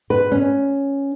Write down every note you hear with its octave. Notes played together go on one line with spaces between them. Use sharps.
B4
C#4